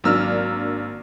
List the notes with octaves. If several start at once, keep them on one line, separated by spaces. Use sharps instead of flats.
G#1 F#3 A#3 D4 E6 F6